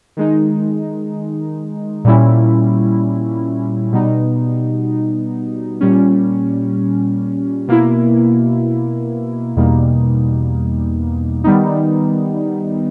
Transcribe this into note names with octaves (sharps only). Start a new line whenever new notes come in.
D#3 G#3 D#4
A#2 G3 C#4 E4
B2 G3 B3 D#4
A#2 G3 C#4
B2 A#3 E4
E2 B2 G3 A#3 D#4
D#3 G3 B3 D#4